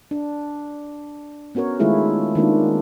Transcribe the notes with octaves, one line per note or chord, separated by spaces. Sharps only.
D4
B3 C#4 F#4 A#4 C#5
D#3 G#3 A3 E4 F4 G#4
D#3 G#3 A#3 C4 D4 F4